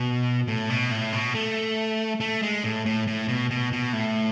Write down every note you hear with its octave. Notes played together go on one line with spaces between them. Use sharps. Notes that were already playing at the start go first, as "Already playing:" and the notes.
Already playing: B2
A2
B2
A2
B2
A3
A3
G#3
A2
A2
A2
B2
B2
B2
A2